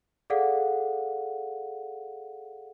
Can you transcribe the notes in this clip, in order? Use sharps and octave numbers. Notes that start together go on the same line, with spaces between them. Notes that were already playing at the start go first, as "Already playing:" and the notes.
G#4 A4 D5 F5 F#5